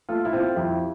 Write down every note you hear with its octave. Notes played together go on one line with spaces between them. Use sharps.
A3 F4 A4
E4
C4 F4
F2 E4 G4